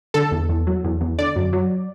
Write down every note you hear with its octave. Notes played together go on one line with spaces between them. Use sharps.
D3 A4
E2
E2
F#3
E2
E2
D3 D5
F#2
F#3